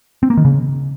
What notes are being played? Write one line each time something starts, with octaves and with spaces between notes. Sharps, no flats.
C4
A#3
D#3
C#3